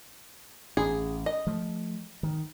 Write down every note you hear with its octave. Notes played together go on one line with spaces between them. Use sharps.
A1 C#4 G#4
D#5
F3 A3
D#3